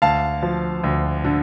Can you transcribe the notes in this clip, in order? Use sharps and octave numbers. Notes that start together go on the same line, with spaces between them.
D2 F5 A5
F3
D2
D3